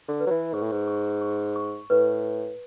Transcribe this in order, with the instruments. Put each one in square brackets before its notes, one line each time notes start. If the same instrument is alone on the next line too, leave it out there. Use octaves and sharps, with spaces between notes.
[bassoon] D3
[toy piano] B4
[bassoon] F#3
E3
[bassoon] G#2 [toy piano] C#6
[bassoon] A2
G#2
[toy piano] C#6
C#6
C#6
[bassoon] A2 [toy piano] B4